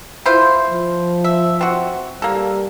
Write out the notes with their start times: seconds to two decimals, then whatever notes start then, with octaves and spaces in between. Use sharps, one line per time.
0.26 E4 F4 C5
0.70 F3
1.24 E5
1.61 C4 F#4
2.22 G3 A#3 A4